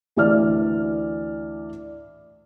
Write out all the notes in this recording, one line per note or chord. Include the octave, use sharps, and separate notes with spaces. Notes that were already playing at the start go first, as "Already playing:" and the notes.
D2 E3 D5 F6